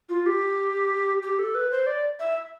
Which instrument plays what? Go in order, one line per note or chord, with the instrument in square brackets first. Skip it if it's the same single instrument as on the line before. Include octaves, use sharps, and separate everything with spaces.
[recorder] F4
G4
G4
A4
B4
C5
D5
E5